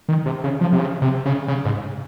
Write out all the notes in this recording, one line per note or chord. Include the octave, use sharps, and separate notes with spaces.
D#3
C3
C#3
F3
C3
C#3
C3
C#3
C#3
G#2